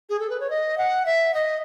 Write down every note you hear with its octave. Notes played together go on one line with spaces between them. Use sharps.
G#4
A4
B4
C#5
D#5
F#5
E5
D#5